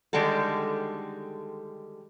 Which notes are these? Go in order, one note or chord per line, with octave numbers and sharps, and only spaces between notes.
D3 D#3 G3 G#3 F#4 A4